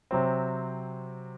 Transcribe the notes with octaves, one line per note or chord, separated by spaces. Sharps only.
C3 F#3 C4